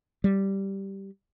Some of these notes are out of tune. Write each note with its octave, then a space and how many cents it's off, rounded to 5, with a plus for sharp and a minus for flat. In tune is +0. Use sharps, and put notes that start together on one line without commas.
G3 -5